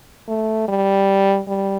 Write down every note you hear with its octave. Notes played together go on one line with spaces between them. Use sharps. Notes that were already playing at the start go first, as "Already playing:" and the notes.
A3
G3
G3